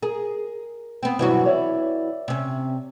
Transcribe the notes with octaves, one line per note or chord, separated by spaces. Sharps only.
G#4 A#4
B3 C4
G2 B2 E3 F#3 E4 F#4
C#5 D5 E5
C3 C#4